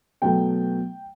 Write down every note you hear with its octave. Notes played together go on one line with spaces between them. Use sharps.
B2 F#3 A3 G5